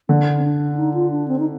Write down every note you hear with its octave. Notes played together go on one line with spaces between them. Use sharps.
D3 D4
C4
D4
D#4
F4
D4
C4
D#4